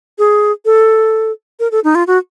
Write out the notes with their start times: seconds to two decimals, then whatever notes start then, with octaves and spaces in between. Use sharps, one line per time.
0.19 G#4
0.65 A4
1.60 A#4
1.71 A4
1.84 D#4
1.95 F4
2.07 F#4